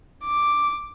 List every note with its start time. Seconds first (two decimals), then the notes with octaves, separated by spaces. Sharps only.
0.24 D6